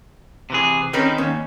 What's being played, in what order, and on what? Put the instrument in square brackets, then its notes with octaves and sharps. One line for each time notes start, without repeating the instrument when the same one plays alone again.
[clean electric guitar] C3 E3 G#4
[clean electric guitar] D#3 D#4 [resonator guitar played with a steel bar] C4 C#4 B4
[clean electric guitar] D#2 [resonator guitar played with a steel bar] C#4